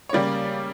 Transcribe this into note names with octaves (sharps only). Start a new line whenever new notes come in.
C#5
C#3 G3 A#3 D5